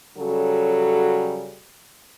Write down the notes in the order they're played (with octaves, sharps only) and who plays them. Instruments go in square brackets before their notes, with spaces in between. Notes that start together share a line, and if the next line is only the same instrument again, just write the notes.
[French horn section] C#3 F#3 G3 C#4 F#4 A4